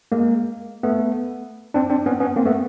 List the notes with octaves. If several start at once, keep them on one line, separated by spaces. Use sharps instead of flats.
G#3 A#3
A3 B3
C4 D4
C4 D4
B3 C#4
B3 C#4
A#3 C4
A3 B3